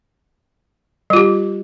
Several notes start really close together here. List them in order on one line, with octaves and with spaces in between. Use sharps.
G3 F4 G4